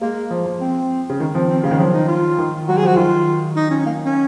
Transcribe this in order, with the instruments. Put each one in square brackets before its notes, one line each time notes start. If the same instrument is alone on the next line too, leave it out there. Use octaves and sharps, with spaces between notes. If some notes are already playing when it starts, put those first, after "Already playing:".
[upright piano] G#3 [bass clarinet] A#3
[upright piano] F3
F3
[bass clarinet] C4
[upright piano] C#3
D#3
[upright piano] F3 [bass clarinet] C4
[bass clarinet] C4
[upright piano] C#3 [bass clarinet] A#3
[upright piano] D#3
[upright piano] F3 [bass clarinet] F#3
[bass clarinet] D#4
F4
[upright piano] D#3
[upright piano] F#3 [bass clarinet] F#4
[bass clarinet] G#4
[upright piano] F3 [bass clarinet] F#4
[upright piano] D#3 [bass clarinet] F4
[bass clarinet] D#4
C#4
A#3
C#4